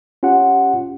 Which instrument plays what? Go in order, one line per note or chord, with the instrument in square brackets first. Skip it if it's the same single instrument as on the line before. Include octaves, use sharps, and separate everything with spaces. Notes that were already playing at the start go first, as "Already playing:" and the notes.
[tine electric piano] C#4 F4 G4 F#5